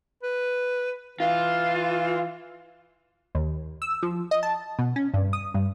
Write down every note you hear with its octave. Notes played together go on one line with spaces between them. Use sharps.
B4
E3 F4
D#2
E6
F3
D#5
A5
B2
C#4
G2
D#6
G2